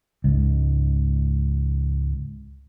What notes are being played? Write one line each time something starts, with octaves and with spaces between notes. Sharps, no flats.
C#2 G#2